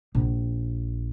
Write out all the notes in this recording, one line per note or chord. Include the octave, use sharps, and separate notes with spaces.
A#1